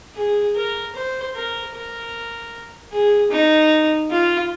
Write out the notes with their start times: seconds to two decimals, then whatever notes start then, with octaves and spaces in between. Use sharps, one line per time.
0.16 G#4
0.56 A#4
0.95 C5
1.35 A#4
1.74 A#4
2.92 G#4
3.31 D#4
4.10 F4